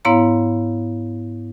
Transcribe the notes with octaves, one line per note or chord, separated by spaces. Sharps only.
G#2 B3 E4 C#5 F5 A#5